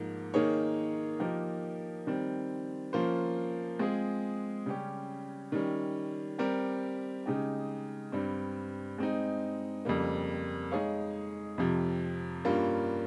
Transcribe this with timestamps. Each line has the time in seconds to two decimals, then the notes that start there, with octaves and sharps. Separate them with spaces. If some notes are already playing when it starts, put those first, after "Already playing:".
Already playing: G#2 F3 A#3
0.34 D#3 A#3 D#4 G#4 C#5
1.19 F3 A#3 D#4 G4 A#4
2.07 D#3 G3 C4
2.93 F3 A#3 C#4 F4 C5
3.79 G#3 C4 F4 G#4
4.66 C#3 G3 C#4 G4
5.52 D#3 G3 C#4
6.38 G3 C4 G4 A#4
7.26 C#3 G#3 D#4 G4
8.12 G2 G3 C4
8.98 G#3 C4 D#4
9.85 F2 C#3 G3 A#3
10.71 G#3 D#4 G#4 C#5 F5
11.58 F2 C3 F3
12.45 G2 G3 A#3 C#4 F4